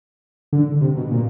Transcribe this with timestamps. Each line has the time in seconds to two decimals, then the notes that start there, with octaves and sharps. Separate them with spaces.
0.53 D3
0.81 C3
0.97 B2
1.11 A#2